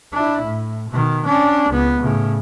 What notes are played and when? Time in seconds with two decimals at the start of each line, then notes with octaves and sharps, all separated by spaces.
0.13 D4 E4
0.42 A2
0.89 B2 D#3
1.26 C#4 D4
1.70 C#2 B3
2.02 A2 C#3